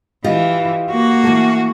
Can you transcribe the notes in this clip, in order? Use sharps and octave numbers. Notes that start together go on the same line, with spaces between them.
E3 F4 G4 D#5
A#3 F#4
E3 A3